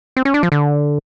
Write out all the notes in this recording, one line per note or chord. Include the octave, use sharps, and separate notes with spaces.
C4
C#4
D4
F3
D3